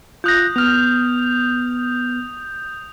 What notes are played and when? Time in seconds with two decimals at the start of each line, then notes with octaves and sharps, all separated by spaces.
0.24 F4 D#6 F#6 G6 A#6
0.56 B3 F6 F7